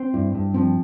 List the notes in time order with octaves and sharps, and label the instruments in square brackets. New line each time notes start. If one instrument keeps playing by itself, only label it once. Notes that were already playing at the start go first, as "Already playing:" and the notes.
Already playing: [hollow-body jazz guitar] C4
[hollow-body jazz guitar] G2 [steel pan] E4
[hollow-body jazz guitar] G2
[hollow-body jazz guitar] F3 [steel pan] C4